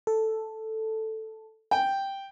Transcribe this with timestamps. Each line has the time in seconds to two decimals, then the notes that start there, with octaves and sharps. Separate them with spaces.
0.07 A4
1.71 G5